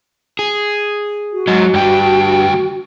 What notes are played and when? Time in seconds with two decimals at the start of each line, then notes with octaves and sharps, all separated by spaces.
0.39 G#4
1.33 F#4
1.48 G#2 F#3
1.74 D2 G2 G3 G5